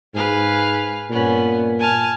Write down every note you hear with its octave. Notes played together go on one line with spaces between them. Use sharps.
G#2 B4 F5 G#5
G2 A#2 B3 C#4
G#5 A5 F6